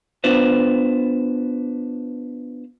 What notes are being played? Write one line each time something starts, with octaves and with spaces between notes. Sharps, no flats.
B3 D4 F4 B4 C5